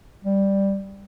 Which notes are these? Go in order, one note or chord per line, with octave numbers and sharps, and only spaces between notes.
G3